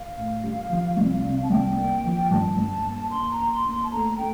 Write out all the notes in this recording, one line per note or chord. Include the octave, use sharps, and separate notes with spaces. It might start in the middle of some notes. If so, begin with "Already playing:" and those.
Already playing: F5
A2
G3
F3
C2
C3
A5
C2 G5
A#3
F3
G2 A5
G2
A#3
A#3 C6
A#5
A#3
C6
A#3
C6
A5
A3 A#5
A3 G5